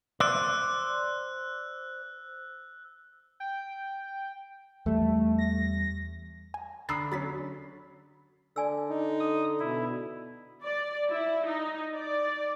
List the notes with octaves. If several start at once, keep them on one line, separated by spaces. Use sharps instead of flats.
C5 D5 E6 F#6
G5
E2 G3 A3
A#6
G#5
D3 A#5 B5 D#6 E6 A6 C7
F#3 C#4 B5 A6 B6
D3 D5 G#5 E6
D#4
D#6
B2 E4
D5
E4
D#4
D5